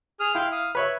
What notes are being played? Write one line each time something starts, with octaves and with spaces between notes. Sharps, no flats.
G#4 D#6 F6
E4 F5 G5 C6
F5 D#6
B4 C#5 E5 F#6